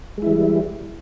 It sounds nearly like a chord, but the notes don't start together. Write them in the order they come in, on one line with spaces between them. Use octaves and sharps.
G#3 E4 E3 G3